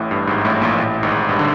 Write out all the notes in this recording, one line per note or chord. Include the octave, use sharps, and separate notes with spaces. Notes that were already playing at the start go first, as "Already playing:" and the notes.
Already playing: A1 A2
G2
G#1 G#2
A1 A2
A#1 A#2
A1 A2
G#1 G#2
G2
D3